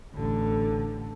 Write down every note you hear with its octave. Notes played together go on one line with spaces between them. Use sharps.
A1 D3